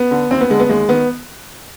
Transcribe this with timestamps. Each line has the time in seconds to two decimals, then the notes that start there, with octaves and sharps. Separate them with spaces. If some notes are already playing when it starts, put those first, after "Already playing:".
Already playing: B3
0.11 D3
0.31 D#2 C4
0.41 B3
0.50 D3 G#3
0.60 B3
0.69 D#2 G#3
0.89 D#3 B3